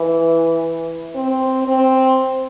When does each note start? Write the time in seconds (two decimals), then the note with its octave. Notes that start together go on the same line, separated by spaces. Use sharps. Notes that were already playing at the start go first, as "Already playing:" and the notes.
Already playing: E3
1.15 C4
1.67 C4